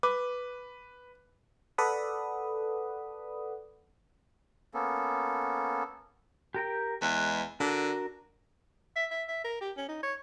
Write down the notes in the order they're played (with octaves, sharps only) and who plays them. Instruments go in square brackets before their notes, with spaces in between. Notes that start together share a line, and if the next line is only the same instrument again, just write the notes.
[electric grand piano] B4 [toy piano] D6
[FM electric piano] A4 B4 D5 F#5 B5 D#6
[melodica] A#3 B3 C#4 A4
[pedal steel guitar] G4 A#4 G5
[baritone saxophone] E2 [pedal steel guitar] G#3 B4 F#5
[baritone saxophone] D3 [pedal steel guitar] D4 F#4 A#4
[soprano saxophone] E5
E5
E5
A#4
G4
C#4
D#4
C#5